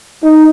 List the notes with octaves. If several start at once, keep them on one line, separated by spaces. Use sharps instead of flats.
D#4